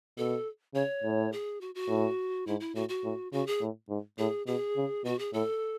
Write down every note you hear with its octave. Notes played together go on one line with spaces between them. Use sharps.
B2 A4
C#3 C#5
A2
G#4
F#4
F#4
A2
G#2 E4
E4
A2 F#4
F#4
A2
C#3 F#4
G#4
A2
G#2
A2 G#4
B2 G#4
C#3
B2 F#4
G#4
A2 A4